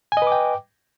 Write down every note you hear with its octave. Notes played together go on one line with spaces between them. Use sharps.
B4 D#5 G5 G#5 D6